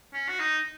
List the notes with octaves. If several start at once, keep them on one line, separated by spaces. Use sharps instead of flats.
C#4
F#4
D#4